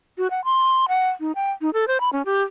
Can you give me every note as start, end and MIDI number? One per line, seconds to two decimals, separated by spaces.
0.18 0.30 66
0.31 0.44 78
0.45 0.85 84
0.89 1.09 78
1.20 1.32 63
1.35 1.51 79
1.62 1.70 63
1.74 1.87 69
1.88 2.00 72
2.01 2.09 83
2.13 2.22 61
2.26 2.42 67